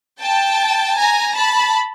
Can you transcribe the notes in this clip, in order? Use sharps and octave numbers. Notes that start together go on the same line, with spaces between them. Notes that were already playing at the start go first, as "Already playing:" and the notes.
G5 A5
G#5 A#5
A5 B5